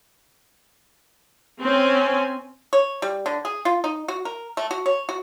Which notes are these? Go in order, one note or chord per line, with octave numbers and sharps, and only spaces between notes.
C4 C#4 G#5
C#5
G3
D3
G#4
F4
D#4
F#4
A#4
A3
F#4
C#5
F#4